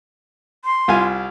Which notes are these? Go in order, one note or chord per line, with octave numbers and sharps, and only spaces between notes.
C6
C2 F4 G#5